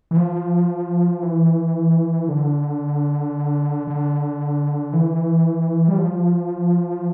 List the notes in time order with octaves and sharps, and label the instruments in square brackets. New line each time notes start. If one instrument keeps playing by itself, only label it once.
[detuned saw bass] E3
F3
E3
D3
D3
E3
G3
F3